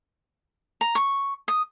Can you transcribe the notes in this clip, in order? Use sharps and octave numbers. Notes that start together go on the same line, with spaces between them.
A#5
C#6
D#6